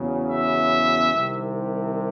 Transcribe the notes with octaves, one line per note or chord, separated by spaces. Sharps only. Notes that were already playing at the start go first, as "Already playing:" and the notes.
Already playing: E2 C#3 F#3
E5
C2 C3 D#3